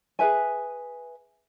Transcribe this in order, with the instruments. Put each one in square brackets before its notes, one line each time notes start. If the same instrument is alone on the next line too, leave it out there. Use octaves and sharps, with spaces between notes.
[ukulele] G#4 B4 E5 G#5